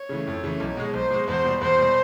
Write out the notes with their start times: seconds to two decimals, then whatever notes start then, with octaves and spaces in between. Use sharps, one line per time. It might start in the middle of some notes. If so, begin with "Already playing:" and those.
Already playing: C#5
0.09 C#3 E3 A3
0.27 F2
0.43 C#3 E3 A3
0.60 B1
0.77 B2 G#3
0.93 B1 C5
1.11 B2 G#3
1.27 E2 C5
1.45 B2 G3
1.61 E2 C5
1.78 B2 G3